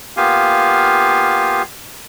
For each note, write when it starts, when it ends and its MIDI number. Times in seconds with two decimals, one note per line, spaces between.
0.17 1.62 58
0.17 1.62 59
0.17 1.62 65
0.17 1.62 67
0.17 1.62 77
0.17 1.62 80